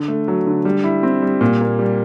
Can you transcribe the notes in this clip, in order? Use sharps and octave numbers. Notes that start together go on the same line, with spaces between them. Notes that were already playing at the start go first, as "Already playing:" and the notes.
Already playing: D3
A3
F#3
D3
G3
E4
C4
G3
A#2
A#3
G3